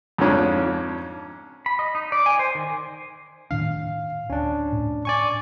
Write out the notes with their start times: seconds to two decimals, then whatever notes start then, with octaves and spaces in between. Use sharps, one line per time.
0.18 F2 G#2 C#4 D4
1.66 B5
1.79 D#5
1.95 D#4
2.12 D5
2.26 G#5
2.39 C5
2.55 D#3
3.51 A2 D#3 D4 F5
4.30 D1 C#4 D4
4.73 A2
5.05 D5 G#5 C#6